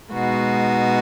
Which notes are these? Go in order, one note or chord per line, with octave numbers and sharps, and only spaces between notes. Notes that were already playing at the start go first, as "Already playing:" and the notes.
B2 G#3 D#4 F#4